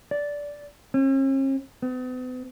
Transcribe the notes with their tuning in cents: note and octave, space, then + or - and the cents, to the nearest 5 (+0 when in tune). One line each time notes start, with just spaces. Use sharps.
D5 -10
C#4 -45
B3 +45